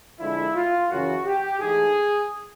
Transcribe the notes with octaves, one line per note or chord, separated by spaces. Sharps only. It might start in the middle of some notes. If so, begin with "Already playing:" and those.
F2 D3 F3 G#3 E4
F4
F#2 C#3 E3 F#4
G4
G#2 E3 A3 G#4